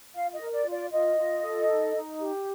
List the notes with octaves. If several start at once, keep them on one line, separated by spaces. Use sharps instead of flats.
F4 F5
D#5
A#4
D5
F4
D5
F4 D#5
F4
A4
D#4
D#4
G4